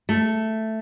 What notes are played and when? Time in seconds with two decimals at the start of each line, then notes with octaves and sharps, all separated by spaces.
0.09 A3